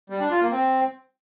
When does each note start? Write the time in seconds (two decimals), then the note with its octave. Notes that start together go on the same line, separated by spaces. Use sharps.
0.10 G3
0.20 D4
0.31 F4
0.41 A#3
0.52 C4